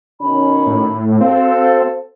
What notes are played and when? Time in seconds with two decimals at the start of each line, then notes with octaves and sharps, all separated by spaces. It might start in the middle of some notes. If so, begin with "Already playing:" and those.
0.21 B2 D#3 C#4 B5
0.66 A2
1.21 C4 F#4 A4 C5 F5